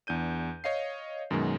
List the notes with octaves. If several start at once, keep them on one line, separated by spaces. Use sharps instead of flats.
E2 D4 G6 D#7
C#5 D#5 F5 C7
F#2 B2 D#3 G#3